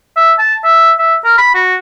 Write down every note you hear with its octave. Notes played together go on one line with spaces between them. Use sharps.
E5
A5
E5
E5
A#4
B5
F#4